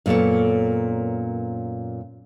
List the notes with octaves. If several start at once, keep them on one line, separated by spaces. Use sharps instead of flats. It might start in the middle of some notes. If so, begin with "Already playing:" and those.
F#2 A#2 B3 A4 C#5